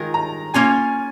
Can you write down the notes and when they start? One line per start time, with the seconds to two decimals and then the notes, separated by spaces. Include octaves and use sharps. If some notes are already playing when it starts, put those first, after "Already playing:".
Already playing: D#3 G#3 F4 A#4 A#5
0.14 A#5
0.54 A#3 C#4 F4 G#5